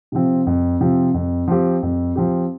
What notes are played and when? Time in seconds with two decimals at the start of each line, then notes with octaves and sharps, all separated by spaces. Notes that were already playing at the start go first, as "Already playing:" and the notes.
0.12 C3 F3 C4
0.47 F2
0.81 C3 F3 C4
1.14 F2
1.48 F3 C4 G4
1.83 F2
2.16 F3 C4 G4